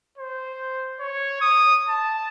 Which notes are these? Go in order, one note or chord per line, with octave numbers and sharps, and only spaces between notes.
C5
C#5
D#6
A5